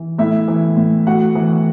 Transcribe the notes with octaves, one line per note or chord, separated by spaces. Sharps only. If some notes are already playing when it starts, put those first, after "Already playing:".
Already playing: E3
A2 E4 E5
E3
A2
A2 F#4 F#5
E3